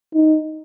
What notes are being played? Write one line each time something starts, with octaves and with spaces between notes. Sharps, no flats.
D#4